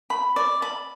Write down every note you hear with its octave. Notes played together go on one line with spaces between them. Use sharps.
B5
D5
B5